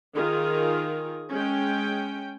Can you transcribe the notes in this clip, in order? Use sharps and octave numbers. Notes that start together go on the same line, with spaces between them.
D#3 F4 G#4 A#4
G#3 C#4 G5